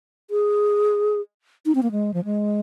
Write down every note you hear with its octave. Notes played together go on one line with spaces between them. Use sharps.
G#4
D#4
C4
A#3
G#3
F3
G#3